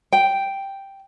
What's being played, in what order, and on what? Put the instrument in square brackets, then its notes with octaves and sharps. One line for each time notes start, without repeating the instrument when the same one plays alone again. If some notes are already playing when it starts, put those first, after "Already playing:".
[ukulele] G5